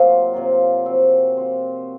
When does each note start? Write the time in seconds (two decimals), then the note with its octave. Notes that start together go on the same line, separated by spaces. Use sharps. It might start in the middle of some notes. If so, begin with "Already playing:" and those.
Already playing: C3 F#3 A#3 F4
0.34 C3 F#3 A#3 F4
0.85 F3 C4 F#4
1.37 F3 C4 F#4